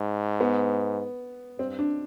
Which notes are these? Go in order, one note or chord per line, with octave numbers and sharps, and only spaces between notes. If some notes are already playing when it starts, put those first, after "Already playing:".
Already playing: G#2
B3
G2 C4
D4